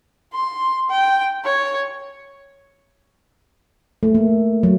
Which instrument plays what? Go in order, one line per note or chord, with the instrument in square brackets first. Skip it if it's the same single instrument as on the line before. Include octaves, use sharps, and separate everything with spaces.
[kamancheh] C6
G5
C#5
[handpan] A3
A#3
F#3